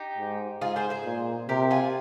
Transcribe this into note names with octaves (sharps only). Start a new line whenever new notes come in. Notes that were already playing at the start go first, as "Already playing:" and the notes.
Already playing: D#4 G4
G#2
G#2 F4 G#4
G#4 C5
G#4 C5
A#2
C3 G4 A#4
F4 G#4